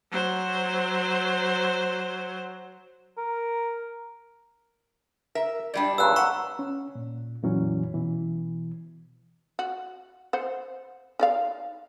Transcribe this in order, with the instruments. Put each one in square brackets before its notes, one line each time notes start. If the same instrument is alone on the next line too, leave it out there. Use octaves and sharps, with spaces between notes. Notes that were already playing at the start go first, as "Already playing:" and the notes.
[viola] F#3 C5
[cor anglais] A#4
[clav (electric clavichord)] A#4 [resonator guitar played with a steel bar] E5
[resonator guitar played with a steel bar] G#2 G3 D4 [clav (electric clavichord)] G4 D5
[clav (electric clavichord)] G2 A#2 C#3 [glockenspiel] E6 F#6
[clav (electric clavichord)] B4 F#5 [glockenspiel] A#5 C#6 E6
[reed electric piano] C#4
A#2
F2 A#2 E3 F#3 C#4
B2 E3
[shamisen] F#4
C5 F#5
D#4 D5 F5